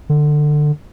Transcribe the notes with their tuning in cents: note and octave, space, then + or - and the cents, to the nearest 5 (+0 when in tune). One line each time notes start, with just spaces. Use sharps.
D3 +20